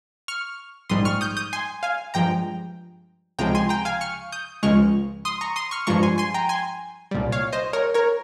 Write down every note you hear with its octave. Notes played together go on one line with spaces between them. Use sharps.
C#6 F6
A#1 G#2 G3 C6 D#6
C#6 F6
D#6 G6
D#6 G6
G#5 C6
F5 G#5
G2 F3 G#3 G5 A#5
C#2 C3 F3 G#3 G5 A#5
G#5 C6
G5 A#5
F5 G#5
C#6 F6
D#6 G6
C#2 C#3 F3 G#3 C#6 F6
C6 D#6
A#5 C#6
C6 D#6
C#6 F6
G2 F3 G#3 A#5 C#6
G#5 C6
G#5 C6
G5 A#5
G#5 C6
C2 A#2 G3
C#5 F5
C5 D#5
A#4 C#5
A#4 C#5